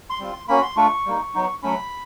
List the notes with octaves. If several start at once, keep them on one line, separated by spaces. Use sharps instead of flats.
C6
G3 C4 F4
A#3 C#4 F#4 B5
C6
A3 D4 F4 C#6
G3 A#3 D#4
F#3 B3 D#4
F#3 A3 C#4 B5